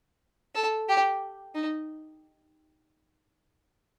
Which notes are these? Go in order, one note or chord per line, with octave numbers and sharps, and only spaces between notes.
A4
G4
D#4